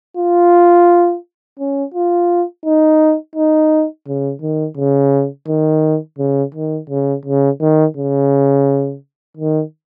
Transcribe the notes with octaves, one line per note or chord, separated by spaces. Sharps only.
F4
C#4
F4
D#4
D#4
C#3
D#3
C#3
D#3
C#3
D#3
C#3
C#3
D#3
C#3
D#3